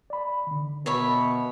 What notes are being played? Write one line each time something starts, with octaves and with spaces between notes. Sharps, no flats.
D5 B5
D3 D#3
B2 C#5 E5 B5